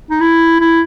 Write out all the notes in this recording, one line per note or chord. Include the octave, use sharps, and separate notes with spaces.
D#4
E4
E4